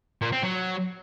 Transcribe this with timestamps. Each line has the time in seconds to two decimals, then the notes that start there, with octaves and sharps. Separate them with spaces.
0.21 A#2
0.32 C4
0.43 F#3